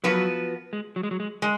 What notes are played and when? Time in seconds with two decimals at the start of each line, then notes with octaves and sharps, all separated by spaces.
0.04 F3 F#3 B3 F#4 B4
0.73 G#3
0.96 F#3
1.03 G#3
1.11 F#3
1.20 G#3
1.42 G#3